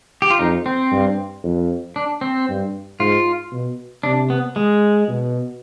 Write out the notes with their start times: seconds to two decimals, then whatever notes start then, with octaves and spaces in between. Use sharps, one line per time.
0.22 G4
0.30 F4
0.39 F2 D#4
0.66 C4
0.92 G2
1.43 F2
1.96 D4
2.21 C4
2.48 G2
3.00 G#2 F4
3.52 B2
4.03 C3 D4
4.30 B3
4.56 G#3
5.08 B2